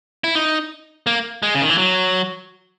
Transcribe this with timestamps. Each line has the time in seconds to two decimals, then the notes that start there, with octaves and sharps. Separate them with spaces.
0.24 E4
0.35 D#4
1.07 A#3
1.43 G#3
1.55 C#3
1.62 D#3
1.69 E3
1.78 F#3